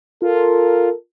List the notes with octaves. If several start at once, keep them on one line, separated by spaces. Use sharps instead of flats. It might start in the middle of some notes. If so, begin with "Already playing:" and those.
F4 A4 A#4